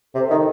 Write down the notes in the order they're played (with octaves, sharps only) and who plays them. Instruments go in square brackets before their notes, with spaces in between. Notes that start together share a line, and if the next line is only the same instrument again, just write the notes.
[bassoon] C3 [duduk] A4
[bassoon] D#3